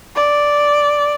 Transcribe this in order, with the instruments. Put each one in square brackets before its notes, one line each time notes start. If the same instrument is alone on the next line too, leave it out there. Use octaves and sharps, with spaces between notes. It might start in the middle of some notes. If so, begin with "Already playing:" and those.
[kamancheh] D5